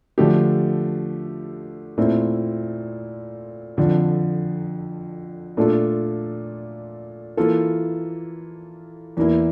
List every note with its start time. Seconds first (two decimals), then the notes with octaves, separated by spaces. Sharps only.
0.18 D3 F3 A3 D4 G4
1.98 A#2 A3 C4 E4
3.77 F2 D3 F3
5.57 A#2 A3 D4 F4 A4
7.37 E3 A#3 F4 A4
9.17 E2 E3 A#3 E4